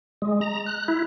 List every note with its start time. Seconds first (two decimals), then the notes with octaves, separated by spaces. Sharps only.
0.22 G#3
0.41 A#5
0.66 F#6
0.88 E4